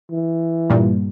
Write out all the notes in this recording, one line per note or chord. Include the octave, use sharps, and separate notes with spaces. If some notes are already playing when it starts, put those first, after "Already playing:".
E3
G2 A#2 G3